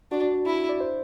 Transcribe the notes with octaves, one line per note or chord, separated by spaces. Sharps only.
D4 F#4
E4
D5
C5